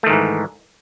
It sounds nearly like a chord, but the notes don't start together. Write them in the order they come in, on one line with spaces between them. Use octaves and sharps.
A3 D#3 G#2 E3